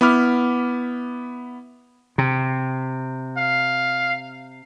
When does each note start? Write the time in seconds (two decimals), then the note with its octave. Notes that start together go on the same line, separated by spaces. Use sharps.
0.01 B3 E4 B5 D6 F6
2.18 C3
3.37 F5